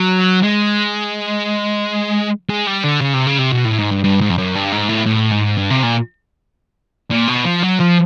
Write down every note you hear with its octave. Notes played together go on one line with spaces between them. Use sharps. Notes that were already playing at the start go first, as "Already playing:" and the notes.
Already playing: F#3
G#3
G#3
G3
D3
C#3
C3
C#3
C3
B2
A2
G#2
G2
G2
G#2
F2
F#2
G2
G#2
A2
A2
G#2
G2
C3
A#2
A#2
B2
F3
F#3
F3